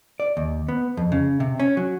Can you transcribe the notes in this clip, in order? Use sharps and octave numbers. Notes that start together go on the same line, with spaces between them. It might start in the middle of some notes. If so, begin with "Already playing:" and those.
D5
D#2
B3
F2
C#3
C3
C#4
F#3